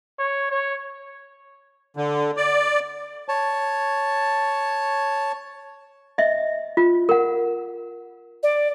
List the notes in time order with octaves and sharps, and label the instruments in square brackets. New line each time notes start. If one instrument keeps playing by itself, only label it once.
[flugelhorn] C#5
C#5
[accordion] D3
D5
[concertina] C#5 A5
[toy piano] D#5 E5
F4
A#4 F#5
[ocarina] D5